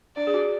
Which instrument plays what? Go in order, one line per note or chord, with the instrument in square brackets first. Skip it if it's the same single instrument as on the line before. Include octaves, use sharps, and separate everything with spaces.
[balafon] D4 [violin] D5
[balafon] G#4
F#4